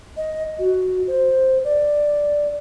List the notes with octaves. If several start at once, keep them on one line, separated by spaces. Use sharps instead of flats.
D#5
F#4
C5
D5